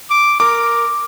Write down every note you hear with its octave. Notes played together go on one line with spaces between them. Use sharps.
D6
A#4 D6